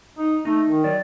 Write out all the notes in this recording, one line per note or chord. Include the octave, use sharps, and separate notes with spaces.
D#4
A3 D#4
D#3
F#3 D5